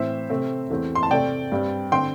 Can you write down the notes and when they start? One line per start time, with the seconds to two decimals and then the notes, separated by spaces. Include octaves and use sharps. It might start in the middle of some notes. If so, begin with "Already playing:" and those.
Already playing: A2 E3 C4 C5 E5
0.30 C3 A3 C4
0.70 E2 E3 A3 C4
0.95 C6
1.03 A5
1.11 C3 A3 C4 D5 G5
1.52 G2 G3 C4
1.92 D3 C4 G5 C6